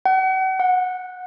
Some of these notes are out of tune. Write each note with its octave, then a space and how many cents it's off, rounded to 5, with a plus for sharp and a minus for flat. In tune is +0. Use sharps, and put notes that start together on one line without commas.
F#5 +40
F#5 -15